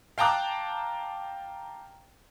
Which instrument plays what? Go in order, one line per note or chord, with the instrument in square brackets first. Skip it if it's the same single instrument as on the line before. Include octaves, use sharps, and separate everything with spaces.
[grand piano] F5 G5 A5 A#5 D6 F#6